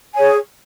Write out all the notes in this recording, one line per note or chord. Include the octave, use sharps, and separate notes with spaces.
G#4 C#5 G#5